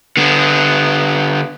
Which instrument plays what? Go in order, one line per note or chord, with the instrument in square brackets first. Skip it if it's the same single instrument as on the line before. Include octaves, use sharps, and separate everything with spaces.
[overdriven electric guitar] D3 B3